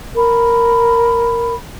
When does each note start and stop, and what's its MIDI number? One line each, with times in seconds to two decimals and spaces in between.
0.15 1.54 70
0.15 1.54 83